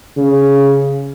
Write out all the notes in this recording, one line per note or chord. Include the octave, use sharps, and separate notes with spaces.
C#3